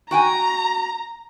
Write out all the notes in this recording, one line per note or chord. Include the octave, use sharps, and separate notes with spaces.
F#4 G5 G#5 A#5